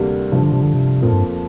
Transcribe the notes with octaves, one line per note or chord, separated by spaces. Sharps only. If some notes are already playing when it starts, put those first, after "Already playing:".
Already playing: D2 C3 G3 A#3
G2 C3 F3 D4 F4
D3
C3
D3
C3
F2 A#2 F3 A#3
G2